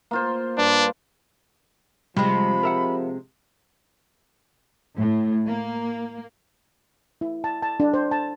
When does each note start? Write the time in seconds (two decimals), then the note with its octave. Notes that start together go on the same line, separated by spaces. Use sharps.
0.11 A#3 F4 C5
0.58 G2 D4
2.16 C3 F3 G3 G#3 B5
2.63 A#4 E5 F#5
4.97 A2
5.47 A#3
7.21 E4
7.44 A5
7.63 A5
7.80 D4
7.94 C5
8.11 A5